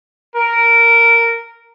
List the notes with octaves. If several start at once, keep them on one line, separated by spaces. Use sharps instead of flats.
A#4